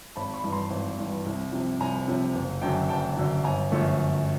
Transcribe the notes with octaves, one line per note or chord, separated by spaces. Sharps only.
G#1 A5 B5
B5 C#6
G2 E3
A#5 C6
G#1
G2 E3
C2
C3 F3
C2 G#5 A#5
C3 F3
F#1
F#2 D3 F#3 G5 A5
F#1 G5 A5
F#2 D3 F#3
G1 G#5 A#5
F#2 D3 F3 A3
G1